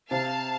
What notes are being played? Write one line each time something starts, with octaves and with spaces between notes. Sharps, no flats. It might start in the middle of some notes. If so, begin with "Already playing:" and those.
C3 F5 A5